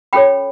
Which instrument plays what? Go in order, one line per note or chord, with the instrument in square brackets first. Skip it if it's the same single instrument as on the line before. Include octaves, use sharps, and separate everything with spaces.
[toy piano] C#4 F#4 A4 C#5 G5 B5